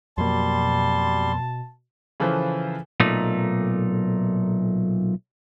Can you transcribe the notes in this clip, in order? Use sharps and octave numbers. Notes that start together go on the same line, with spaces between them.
F2 B2 F#3 G3 A#3 A5 C6
C#3 E3 F3 A4 B4 C5
B1 A#2 A3 D#4